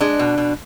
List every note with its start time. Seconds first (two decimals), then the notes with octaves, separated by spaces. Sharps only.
0.01 G#3 D4
0.19 B2
0.38 B2